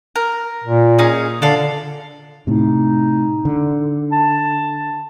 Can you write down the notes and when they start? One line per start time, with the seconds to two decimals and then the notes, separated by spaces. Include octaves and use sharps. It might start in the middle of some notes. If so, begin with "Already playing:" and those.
0.16 A#4
0.64 A#2
0.99 C#4 D#4 G#4
1.42 D3 A4 D5 F5
2.47 A2 C3 D#4
3.45 D3
4.12 A5